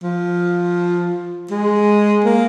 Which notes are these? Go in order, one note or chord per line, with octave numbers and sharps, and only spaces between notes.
F3
G#3
A#3